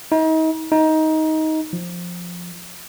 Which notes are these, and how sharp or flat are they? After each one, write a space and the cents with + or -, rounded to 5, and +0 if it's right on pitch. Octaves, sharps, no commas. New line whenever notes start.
D#4 +35
D#4 +15
F3 +10